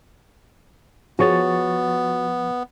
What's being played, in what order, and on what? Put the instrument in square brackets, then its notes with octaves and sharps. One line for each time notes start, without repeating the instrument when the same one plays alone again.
[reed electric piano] F3 C#6 A6 [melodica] B3 [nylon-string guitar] F#4 G#4 C#5